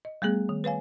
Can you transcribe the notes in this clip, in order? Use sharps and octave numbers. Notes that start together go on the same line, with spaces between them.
D#5
G3 A3 B3 G#4
D#3
B4 C#5 F5 G#5